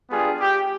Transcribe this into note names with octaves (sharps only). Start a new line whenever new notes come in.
G3 B3 D4 F4 G#4
G4